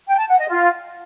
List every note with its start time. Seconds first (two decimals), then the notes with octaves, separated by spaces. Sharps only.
0.08 G5
0.18 A5
0.28 F#5
0.38 D#5
0.49 F4